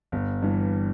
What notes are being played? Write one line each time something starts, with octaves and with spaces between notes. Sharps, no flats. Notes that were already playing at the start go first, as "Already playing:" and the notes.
G1
G2 E3